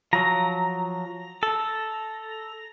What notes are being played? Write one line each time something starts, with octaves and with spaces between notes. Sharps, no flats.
F3 F#3 A#5
A4